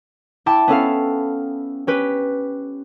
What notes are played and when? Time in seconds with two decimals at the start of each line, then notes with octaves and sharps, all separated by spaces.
0.46 E4 G5 A5 D6
0.68 B3 C#4 A4 F5
1.87 C#4 G4 B4